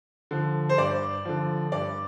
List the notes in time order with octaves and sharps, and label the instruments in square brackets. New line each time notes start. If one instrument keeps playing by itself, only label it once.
[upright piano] D3 F3
C5
G2 D5
D3 F3
G2 D5